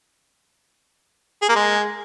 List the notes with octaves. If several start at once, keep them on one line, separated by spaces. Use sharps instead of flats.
G#4
A#3
G#3